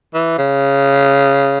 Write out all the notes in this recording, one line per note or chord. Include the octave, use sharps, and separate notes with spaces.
E3
C#3